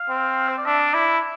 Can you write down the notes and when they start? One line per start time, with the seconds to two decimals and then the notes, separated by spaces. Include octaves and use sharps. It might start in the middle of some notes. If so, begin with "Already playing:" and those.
Already playing: F5
0.09 C4
0.49 C5
0.58 D5
0.66 D4 E5
0.80 D5
0.94 E4